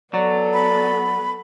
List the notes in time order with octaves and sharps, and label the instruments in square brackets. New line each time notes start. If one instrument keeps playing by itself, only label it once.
[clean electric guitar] F#3 [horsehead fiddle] B3 A4 [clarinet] D5
[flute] B5